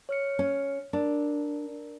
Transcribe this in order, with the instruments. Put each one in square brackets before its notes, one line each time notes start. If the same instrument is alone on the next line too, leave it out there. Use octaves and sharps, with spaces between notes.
[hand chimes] C#5 F6 C#7
[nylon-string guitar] C#4
[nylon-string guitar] D4 [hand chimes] A#4